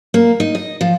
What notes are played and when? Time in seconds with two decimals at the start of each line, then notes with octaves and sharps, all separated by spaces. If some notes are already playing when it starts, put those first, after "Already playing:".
0.14 A#3
0.40 D#4
0.55 D#5
0.81 F3